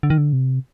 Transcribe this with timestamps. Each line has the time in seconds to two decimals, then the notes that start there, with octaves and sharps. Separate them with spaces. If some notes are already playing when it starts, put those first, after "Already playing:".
0.03 D3
0.10 D#3
0.18 D3
0.33 C3